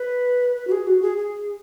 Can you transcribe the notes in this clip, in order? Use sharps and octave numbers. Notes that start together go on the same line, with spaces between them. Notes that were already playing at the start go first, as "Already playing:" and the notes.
Already playing: B4
B4
F#4
G#4
F#4
G#4
G#4